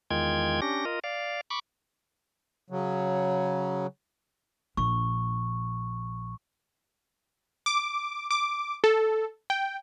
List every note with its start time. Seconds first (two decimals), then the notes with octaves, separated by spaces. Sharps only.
0.11 E2 D#3 G#3 F4 G5 G#6
0.62 C#4 D4 G4 A#6
0.85 F4 A#4 D#5
1.04 D5 F5
1.50 B5 C#6 D6
2.70 C#3 F#3
4.77 A#1 D4 C#6
7.66 D6
8.31 D6
8.84 A4
9.50 G5